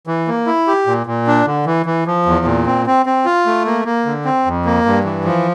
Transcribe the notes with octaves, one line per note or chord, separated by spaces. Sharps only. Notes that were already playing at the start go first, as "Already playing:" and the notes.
E3
A#3
E4
G4
A#2
A#2
D4
D3
E3
E3
F3
E2
A#2
C4
C4
C4
F4
A3
A#3
A#3
D3
C4
F2
A#3
G2
E3
F3